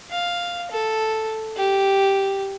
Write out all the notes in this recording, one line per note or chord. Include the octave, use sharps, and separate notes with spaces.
F5
A4
G4